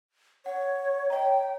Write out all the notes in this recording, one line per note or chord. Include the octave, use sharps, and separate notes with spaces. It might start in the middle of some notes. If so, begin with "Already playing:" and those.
C#5 F#5
C#5 D#5 G5 A#5